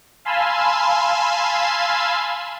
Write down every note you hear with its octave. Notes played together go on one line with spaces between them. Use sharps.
F5 G#5 A5 B5 C6 E6